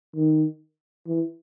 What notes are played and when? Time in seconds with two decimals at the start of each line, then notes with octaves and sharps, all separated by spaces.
0.16 D#3
1.07 E3